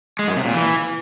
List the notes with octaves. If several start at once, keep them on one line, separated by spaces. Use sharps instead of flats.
G#3
F#2
C3
A#2
E3